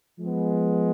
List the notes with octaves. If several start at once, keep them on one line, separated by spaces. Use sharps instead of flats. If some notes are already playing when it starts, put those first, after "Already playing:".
F3 G#3 B3